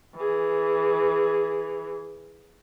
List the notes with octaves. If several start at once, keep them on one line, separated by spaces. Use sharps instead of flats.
E3 G#4